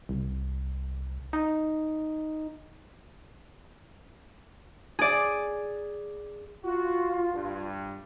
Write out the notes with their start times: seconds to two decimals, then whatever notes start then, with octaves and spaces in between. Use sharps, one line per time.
0.09 C2
1.33 D#4
4.99 G#4 D5
6.64 F4 F#4
7.33 G2